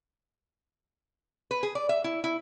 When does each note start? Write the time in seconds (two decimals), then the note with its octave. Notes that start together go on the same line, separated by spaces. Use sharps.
1.51 B4
1.63 G#4
1.75 D5
1.89 E5
2.04 E4
2.24 E4